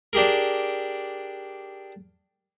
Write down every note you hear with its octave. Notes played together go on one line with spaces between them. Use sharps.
D4 G4 G#4 A#4